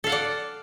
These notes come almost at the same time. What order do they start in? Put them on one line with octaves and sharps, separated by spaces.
A4 F5 F#5 D5